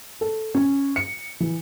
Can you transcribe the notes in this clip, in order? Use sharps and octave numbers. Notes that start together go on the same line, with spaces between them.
A4
C#4
C#7
E3